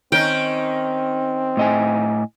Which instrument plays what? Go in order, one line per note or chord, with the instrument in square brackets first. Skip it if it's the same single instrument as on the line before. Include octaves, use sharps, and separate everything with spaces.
[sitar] D#3 C#4 D#4 [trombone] C4 [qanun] G5
[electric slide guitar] A2 D#5 G#5